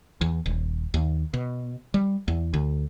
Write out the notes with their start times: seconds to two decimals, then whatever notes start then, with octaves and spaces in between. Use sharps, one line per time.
0.21 E2
0.46 D#1
0.94 D#2
1.34 B2
1.94 G3
2.28 E2
2.54 D2